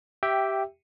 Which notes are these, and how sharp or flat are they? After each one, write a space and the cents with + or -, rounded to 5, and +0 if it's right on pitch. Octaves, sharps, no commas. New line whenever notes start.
G4 -10 E5 +0 G5 +0